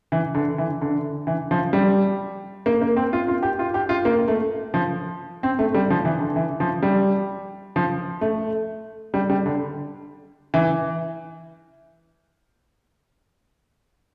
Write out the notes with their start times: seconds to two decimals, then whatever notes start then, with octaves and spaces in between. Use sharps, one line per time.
0.12 E3
0.35 D3
0.58 E3
0.81 D3
1.27 E3
1.51 F3
1.73 G3
2.66 A#3
2.81 A#3
2.96 C4
3.13 F4
3.28 F4
3.43 G4
3.59 F4
3.74 G4
3.89 F4
4.05 A#3
4.28 A3
4.74 F3
5.43 C4
5.59 A3
5.74 G3
5.90 F3
6.05 E3
6.20 D3
6.36 E3
6.60 F3
6.83 G3
7.76 F3
8.21 A3
9.14 G3
9.30 G3
9.46 D3
10.54 E3